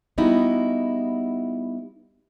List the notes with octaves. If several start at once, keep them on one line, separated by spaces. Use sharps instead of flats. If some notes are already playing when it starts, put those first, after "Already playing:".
G3 B3 D#4 E4 F#4